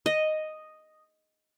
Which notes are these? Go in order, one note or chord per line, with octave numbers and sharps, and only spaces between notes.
D#5